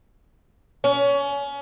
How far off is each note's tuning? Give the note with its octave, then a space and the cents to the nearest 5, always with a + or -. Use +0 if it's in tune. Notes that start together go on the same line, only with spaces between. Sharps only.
C#4 +25